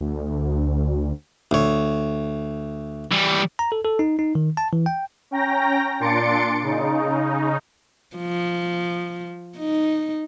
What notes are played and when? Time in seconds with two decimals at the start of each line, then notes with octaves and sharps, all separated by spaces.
0.01 D2
1.51 D2 C#5
3.12 E3 G3
3.59 A#5
3.72 A4
3.85 A4
3.99 D#4
4.19 D#4
4.35 D#3
4.57 A5
4.73 E3
4.86 G5
5.31 C#4 G5 A#5 A#6
6.00 A#2 D4 C6 A6 C#7 D7
6.63 C#3 D#4
8.16 F3
9.58 D#4